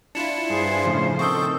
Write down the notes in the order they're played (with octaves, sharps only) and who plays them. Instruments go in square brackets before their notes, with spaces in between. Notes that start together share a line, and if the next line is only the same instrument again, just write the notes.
[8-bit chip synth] D4 E4 F4 [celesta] C#7 E7
[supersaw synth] G2 G#4 [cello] C5
[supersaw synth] A2 C#3 F3
[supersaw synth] D#3 A4 [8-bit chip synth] C4 G6 [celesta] C#6 D#6 E6